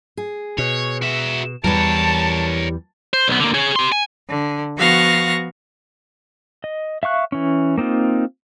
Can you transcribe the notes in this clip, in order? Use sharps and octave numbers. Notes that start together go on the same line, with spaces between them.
G#4
B2 C#5
F#4 E5
E2 E3 G3 A#4 C#5 A5
C5
B1 B3
D3 A#3
G#4 C#5
G4 C6
G#5
D3
F3 B3 F#4 F5 C#6 A#6
D#5
E5 F5 C#6 F#6
E3 C#4
A#3 C4 D#4 F4